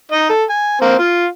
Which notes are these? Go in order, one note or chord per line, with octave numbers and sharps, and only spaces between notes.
D#4 D#5
A4
G#5
A#3 C4
F4